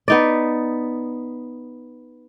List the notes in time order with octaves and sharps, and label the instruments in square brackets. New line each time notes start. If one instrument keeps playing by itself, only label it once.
[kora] B3 D#4 D5